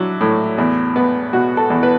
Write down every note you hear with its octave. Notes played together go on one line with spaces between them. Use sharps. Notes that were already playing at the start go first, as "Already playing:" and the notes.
Already playing: F#3 D4 E4
A2
E2
B3
B2 F#4
A4
E2
B4